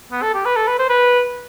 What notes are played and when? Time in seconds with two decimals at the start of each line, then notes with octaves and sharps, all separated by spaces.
0.12 B3
0.22 A4
0.34 G4
0.45 B4
0.56 A4
0.67 B4
0.79 C5
0.89 B4